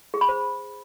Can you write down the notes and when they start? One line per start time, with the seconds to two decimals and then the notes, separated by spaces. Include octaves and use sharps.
0.14 G#4
0.21 B5
0.29 C5